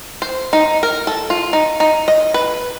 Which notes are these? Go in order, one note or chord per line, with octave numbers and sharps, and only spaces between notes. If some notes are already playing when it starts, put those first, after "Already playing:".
C5
D#4
A#4
A4
F4
D#4
D#4
D#5
B4